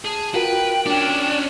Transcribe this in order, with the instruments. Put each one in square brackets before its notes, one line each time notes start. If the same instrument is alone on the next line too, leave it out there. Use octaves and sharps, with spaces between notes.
[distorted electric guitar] G#4 [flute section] A5
[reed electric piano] F4 F#4 A#4 [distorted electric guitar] B4 [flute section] G5
[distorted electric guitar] C#4 D5 [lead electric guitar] D4